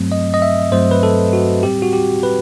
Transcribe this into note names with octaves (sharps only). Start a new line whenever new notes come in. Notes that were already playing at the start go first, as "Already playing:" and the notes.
Already playing: G2 F#3 A3 C4
D#5
D#5
E5
G2 F#3 A3 C4 C5
B4
A4
F#4
A2 G3 C4 G4
F#4
G4
B4